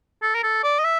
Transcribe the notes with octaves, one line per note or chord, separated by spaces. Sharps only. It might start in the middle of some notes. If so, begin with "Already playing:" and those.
A4
A#4
A4
D5
D#5
E5